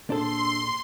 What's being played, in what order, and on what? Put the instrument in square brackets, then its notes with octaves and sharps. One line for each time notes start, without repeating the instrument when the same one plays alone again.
[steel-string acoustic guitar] A#2 G#4 C5 [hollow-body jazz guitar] D4 A4 [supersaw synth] C6